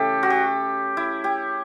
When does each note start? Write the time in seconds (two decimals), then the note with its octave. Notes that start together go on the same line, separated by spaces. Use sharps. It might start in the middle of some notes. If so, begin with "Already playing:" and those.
Already playing: C#3 E3 A3 G4 A4
0.23 F#4
0.30 G4
0.97 E4
1.24 G4